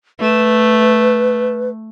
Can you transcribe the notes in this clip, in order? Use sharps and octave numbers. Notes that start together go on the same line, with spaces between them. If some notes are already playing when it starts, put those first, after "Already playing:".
A3 B4